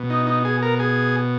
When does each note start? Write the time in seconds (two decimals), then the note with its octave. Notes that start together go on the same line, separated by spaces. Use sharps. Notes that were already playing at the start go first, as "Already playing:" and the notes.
Already playing: B2
0.10 D#4
0.27 D#4
0.45 G#4
0.62 A#4
0.79 G#4